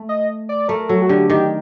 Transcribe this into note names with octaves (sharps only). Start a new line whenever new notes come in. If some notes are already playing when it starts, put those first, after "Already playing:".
Already playing: A3
D#5
D5
A3 A#4
F#3 A4
F#4
D3 G4
D#3 G4